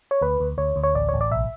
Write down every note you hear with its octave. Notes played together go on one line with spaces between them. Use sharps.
C#5
D2 B4
D2
D2 C#5
D2
C#5
A1 D5
A1 C#5
D5
B1 E5